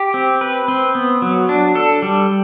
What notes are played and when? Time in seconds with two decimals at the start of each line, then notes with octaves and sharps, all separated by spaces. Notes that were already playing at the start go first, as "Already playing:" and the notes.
Already playing: G4
0.14 C4
0.41 B4
0.68 C4
0.95 B3
1.22 F#3
1.49 D4
1.75 A4
2.02 G3